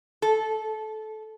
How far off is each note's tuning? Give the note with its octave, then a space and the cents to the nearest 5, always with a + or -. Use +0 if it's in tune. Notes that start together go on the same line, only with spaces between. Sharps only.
A4 -20